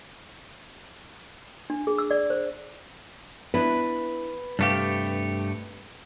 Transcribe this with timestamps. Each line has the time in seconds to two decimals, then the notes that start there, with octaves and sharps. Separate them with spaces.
1.70 D4
1.87 G#4
1.98 E6
2.11 D5
2.30 C5
3.54 B3 D4 E4 B4
4.59 G2 C3 A3 G4 F5